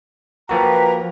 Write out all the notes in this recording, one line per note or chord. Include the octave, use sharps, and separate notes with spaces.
F3 A#3 F#4 B4 G5 A#5